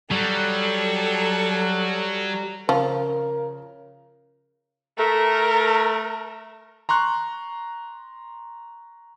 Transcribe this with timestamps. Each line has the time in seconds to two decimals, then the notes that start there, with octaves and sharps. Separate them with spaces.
0.11 F#3 G3 A4
2.69 C#3 F3 F4 A#4
4.98 A3 A#4
6.89 A#5 C6 C#6 F#6